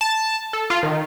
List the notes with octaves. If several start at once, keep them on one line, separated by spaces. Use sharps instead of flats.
A5
A4
F4
D#3